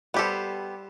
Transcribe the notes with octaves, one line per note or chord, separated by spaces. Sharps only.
G3 B3 G4 A4 C5